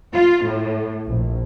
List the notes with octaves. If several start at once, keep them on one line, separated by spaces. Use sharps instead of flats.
F4
A2
A#1